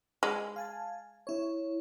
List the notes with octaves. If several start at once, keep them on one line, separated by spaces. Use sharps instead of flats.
G#3
F5 G#5 A5
E4 C#5